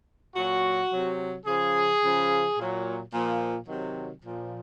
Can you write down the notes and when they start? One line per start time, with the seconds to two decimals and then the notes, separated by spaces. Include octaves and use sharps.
0.35 A#2 F#3 F#4
0.91 C3 F#3
1.46 C#3 F3 G#4
2.02 C#3 F3
2.57 A#2 F#3
3.12 A#2 F3
3.67 C3 D#3 F#3
4.23 A#2 F3